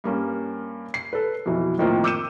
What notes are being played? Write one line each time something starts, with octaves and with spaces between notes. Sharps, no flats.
G2 A#3 C#4
C7
A4 B4
F2 B2 E3 F#3
A2 D#3 F3 A#3 C4 F4
D6 E6 G6 C#7 D#7 E7